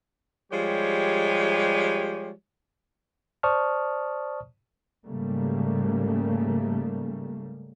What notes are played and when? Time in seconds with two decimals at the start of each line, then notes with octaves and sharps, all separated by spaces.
0.51 F3 G3 G#3 G4 C#5
3.43 C5 D5 A5 C#6 D#6 F6
5.04 G#2 C#3 G3 A3 A#3